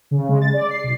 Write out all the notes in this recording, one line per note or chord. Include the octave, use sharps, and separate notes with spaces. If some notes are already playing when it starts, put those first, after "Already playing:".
C#3
G#3
A6
D5
C7
B1